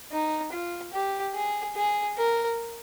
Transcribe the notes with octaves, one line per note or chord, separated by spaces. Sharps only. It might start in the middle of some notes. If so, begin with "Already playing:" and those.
D#4
F4
G4
G#4
G#4
A#4